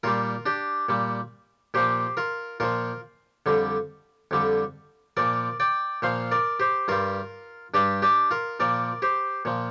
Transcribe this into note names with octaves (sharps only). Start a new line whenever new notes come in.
A#2 G3 F4 A#4
D4 G4
A#2 G3
A#2 F3 G4 C5
F4 A#4
A#2 F3 F4 A#4
F2 D3 G3
F2 D3 G3
A#2 F3 A#4 D5
D5 G5
A#2 F3 C5 F5
A#4 D5
G4 C5
G2 G3 F4 A#4
G2 G3 D4 G4
D4 G4
F4 A#4
A#2 F3 A#4 D5
G4 C5
A#2 F3